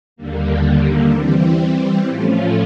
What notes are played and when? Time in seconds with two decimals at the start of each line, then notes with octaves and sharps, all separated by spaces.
0.16 D#2 D3 G3 A#3
1.12 E3 G3 C4
2.08 A2 F3 A3 C#4 F4